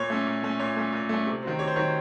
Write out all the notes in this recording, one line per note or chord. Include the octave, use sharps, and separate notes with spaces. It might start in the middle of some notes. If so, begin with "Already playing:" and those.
Already playing: A#2 C#5
A3 C#4
A#2
A3 C#4
A#2 C#5
A3 C#4
A#2
A3 C#4
C3
D#3 F#3 C4
C3 C#5
C5
D#3 F#3 C4 C#5